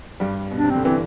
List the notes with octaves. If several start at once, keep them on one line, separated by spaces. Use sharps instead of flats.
G2 G3
B2
D4
C3
D3 C4
E3 C4